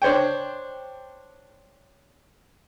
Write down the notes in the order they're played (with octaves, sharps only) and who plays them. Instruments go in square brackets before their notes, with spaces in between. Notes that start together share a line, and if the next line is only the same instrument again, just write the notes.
[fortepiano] D4 C5 C#5 G5